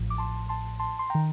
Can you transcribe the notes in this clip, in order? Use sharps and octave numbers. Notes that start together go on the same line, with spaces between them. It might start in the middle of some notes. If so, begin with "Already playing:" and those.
Already playing: A1 A2 F3
D6
A5 C6
A5 C6
A5 C6
C6
D#3 G5 A#5